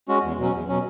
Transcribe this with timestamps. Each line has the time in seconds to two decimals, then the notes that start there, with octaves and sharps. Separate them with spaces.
0.08 G#3 C#4 F#4
0.23 E2
0.38 B2 F#3 C#4
0.53 E2
0.68 B2 F#3 C#4